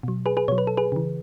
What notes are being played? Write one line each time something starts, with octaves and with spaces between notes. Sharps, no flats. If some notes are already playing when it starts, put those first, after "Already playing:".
B2 F#3
G#4 B4
G#4 B4
B2 F#3 C#5
B4
A4
G#4 B4
C#3 E3